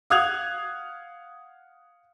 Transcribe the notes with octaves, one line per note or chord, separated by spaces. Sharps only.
F5 F#5 D#6 F#6 G#6 F7